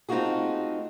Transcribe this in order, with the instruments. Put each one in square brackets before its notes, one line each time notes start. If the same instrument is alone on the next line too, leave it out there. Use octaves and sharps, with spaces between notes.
[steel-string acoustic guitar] A3 C4 D#4 F4 F#4 G#4